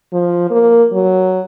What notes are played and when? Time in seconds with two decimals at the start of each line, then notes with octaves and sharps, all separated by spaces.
0.13 F3
0.51 A#3
0.93 F#3